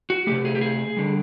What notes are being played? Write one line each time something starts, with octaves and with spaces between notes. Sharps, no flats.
F#4
C3 F3 A3 G4
G#4
G4
G#4
D3 G3